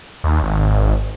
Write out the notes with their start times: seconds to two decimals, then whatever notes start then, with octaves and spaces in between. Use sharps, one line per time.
0.24 D#2
0.43 G#1